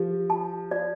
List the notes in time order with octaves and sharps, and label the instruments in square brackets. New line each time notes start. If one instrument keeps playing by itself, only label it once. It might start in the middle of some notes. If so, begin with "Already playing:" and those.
Already playing: [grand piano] F3 [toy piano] G4
[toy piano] A5
D5